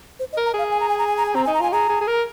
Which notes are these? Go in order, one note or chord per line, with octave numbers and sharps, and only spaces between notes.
C5
D#5
A#4
A#5
G#4 F5
G#5
A#5
G#5
A#5
G#5
A#5
G#5
C4 A#5
D#4 G#5
A#5
F4 G#5
G#4 A#5
G#4
G#4
A#4